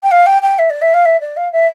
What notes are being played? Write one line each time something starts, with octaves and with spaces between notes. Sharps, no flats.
G5
F5
G5
G5
E5
D5
E5
F5
E5
D5
F5
E5